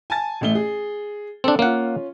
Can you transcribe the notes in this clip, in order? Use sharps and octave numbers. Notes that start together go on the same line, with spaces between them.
G#5 A5 A6
A1 A3 G7
G#4
C4 D4 A4
A#3 C#4 F4 F#5